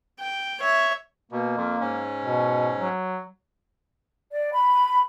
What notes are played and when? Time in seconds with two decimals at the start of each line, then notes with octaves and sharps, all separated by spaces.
0.19 G5
0.60 C#5 E5
1.32 B2 A#3
1.57 F2
1.81 G#2 C#4
2.25 B2
2.78 F#3
4.31 D5
4.52 B5